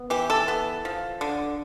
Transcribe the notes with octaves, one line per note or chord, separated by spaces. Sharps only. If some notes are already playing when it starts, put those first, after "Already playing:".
Already playing: B3
E3 G4
A4
B3
F3
D3